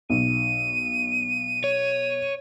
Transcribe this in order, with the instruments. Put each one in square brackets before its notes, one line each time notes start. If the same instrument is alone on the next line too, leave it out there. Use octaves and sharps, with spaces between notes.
[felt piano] B1 [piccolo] D#7
[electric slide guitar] C#5